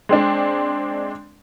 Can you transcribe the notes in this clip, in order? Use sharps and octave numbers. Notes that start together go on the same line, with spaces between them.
G#3 C4 D4